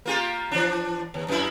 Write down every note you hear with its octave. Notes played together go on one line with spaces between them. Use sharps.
A#3 F4 G4
E3 D4
D#2
F#2 E4